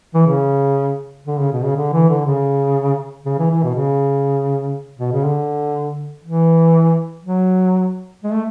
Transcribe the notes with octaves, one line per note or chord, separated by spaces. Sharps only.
E3
C#3
D3
C#3
B2
C#3
D3
E3
D3
C#3
C#3
E3
E3
B2
C#3
B2
C#3
D3
E3
F#3
G#3
A3